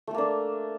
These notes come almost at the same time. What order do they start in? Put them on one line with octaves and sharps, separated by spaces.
A3 A4 A#3 D4